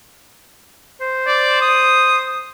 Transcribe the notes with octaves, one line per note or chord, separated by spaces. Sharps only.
C5
D5
D#6